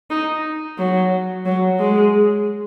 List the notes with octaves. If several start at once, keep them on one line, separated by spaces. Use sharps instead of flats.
D#4
F#3
F#3
G#3